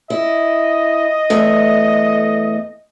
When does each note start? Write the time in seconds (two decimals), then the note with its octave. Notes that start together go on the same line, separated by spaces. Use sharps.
0.10 E4 D#5
1.30 E2 A3